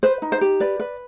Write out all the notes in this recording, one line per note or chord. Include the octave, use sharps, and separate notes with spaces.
B4 C5
D#4
C5
G4
B4 D5
B4